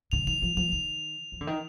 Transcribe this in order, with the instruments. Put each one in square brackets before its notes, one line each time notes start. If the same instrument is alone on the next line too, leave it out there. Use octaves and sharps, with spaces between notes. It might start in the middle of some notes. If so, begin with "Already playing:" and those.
[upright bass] D3 [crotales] F7
[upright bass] D#3 [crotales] F7
[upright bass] F3
[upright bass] F3 [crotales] F7
[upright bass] D#3 [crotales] F7
[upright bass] F3
D3
D#3